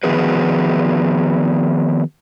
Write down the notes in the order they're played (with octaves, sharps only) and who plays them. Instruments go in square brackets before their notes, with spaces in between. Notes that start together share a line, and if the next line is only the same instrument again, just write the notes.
[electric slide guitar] D#3 F3 B3 F#4 G#4 B4